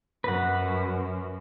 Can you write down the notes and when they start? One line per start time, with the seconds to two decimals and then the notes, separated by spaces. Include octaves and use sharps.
0.24 F#2 B4 F#5